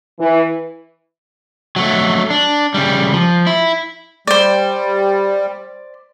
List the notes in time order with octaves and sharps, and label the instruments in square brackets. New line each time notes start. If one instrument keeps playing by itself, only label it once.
[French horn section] E3
[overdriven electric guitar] F#3 A3
D4
C#3 G3
F3
E4
[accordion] G3 [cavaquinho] C5 D5